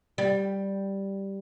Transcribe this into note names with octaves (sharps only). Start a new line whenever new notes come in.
G3